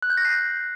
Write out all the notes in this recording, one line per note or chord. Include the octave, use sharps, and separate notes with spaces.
F#6
G6
A#6
C7